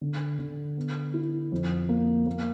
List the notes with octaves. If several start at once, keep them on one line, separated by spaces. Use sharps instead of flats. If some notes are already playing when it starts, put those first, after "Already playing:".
D3
D3
B3
E4
F2
A#3
A#3